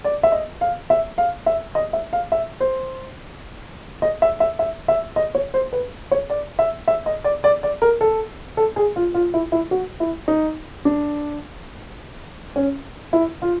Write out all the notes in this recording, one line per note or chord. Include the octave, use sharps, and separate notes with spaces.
D5
E5
D#5
F5
E5
F5
E5
D#5
E5
F5
E5
C5
D#5
E5
E5
E5
E5
D#5
C#5
C5
B4
C#5
D5
E5
E5
D#5
D5
D5
D5
A#4
A4
A4
G#4
F4
F4
E4
E4
F#4
E4
D#4
D4
C#4
E4
F4